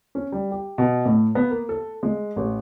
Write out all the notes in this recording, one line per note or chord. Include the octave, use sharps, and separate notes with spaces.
C#4
G3
G4
B2
A2
B3
A#3
A4
G#3
A1